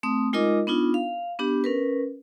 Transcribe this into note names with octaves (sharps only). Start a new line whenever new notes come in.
A3 C4 D#6
G#3 D#4 F4 A#4 D#5 D6
B3 D4 D#4 F4
F5
B3 D4 G4
C#4 A#4 B4